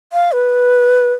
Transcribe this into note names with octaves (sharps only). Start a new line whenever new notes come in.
F5
B4